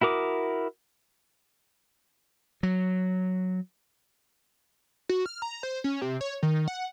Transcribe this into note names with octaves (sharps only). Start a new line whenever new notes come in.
E4 F#4 A#4 D6 D#6
F#3
F#4
F6
A#5
C5
C#4
C3
C#5
D#3
F#5